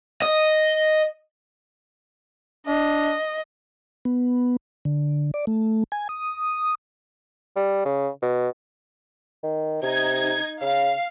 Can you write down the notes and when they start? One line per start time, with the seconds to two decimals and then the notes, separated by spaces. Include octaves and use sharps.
0.22 D#5
2.67 D4 D#5
4.05 B3
4.85 D3
5.34 D5
5.47 A3
5.92 G#5
6.09 D#6
7.56 G3
7.85 C#3
8.22 B2
9.43 D#3
9.83 C3 D#4 G#6
10.61 C#3 F5